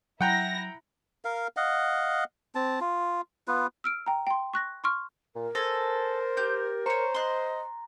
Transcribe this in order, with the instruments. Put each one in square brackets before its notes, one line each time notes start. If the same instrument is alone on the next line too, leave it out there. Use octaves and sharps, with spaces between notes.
[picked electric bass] F#3 [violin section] E4 A#6 [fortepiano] F#5 G5 A#5
[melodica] A#4 F5
D#5 F5 F#5
C4 A5
F4
B3 F4 B4
[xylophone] E6 F6 D7
G5 A#5
G5 C6
C#6 F#6 A#6
C6 C#6 F6
[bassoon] A#2 [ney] A#4
[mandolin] A4 G#5 [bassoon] C5 [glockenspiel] A6 A#6
[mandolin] G4 G6
[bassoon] C5 [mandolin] C#5 C#6 [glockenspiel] A#5
[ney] D#5 [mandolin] C6 F#6